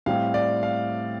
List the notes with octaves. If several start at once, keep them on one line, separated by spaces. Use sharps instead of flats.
A2 G3 C4 F5
D5
F5